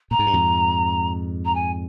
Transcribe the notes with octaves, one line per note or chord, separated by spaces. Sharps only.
A#2 A#5
G#2
G2
F2 G#2
A#5
G#5